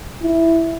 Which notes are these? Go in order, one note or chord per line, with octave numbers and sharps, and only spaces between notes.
E4